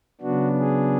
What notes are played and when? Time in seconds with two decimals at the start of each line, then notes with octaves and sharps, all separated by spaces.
0.21 C#3 F#3 B3 D4 F#4
0.60 G#4